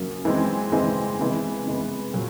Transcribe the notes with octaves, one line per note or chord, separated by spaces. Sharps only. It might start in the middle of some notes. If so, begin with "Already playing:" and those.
Already playing: F#2 C#3 F#3 A#3
E3 G#3 C4
E3 G#3 C4
C3 E3 G#3 B3
C3 E3 G#3 B3
A#2 F#3